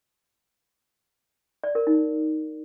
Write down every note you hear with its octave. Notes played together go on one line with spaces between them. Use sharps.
D5
A#4
D#4